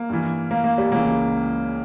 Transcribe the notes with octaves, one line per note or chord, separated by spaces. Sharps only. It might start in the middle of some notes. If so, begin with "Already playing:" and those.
Already playing: A#3
G2 E3
A#3
A#3
G3
C#2 C#3 E3 A#3